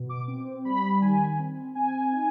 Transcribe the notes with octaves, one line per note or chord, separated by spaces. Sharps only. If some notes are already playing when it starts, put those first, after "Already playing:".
Already playing: B2
D6
C4
G3 B5
D#3 G#5
C4
C4 G#5
D#4